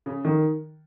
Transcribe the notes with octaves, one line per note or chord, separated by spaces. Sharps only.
C#3
D#3